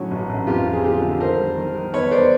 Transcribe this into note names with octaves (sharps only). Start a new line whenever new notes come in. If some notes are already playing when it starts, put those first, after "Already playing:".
Already playing: A2 D3 F#3 C#4
A1
A1
F2 F4 G4
F2
G#4
D3 F4 G4
D3
D#3 A#4 C5
G3
D#3
D#3
E2 B4 C#5
E2 C5 D5